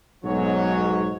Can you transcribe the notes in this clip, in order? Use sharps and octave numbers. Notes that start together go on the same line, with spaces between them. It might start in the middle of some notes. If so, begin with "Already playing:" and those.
B1 G#2 F#3 C#5